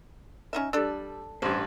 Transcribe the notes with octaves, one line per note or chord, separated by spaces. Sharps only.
C#4 D#4 E5
G3 D4 A4 E6
A1 G2 C5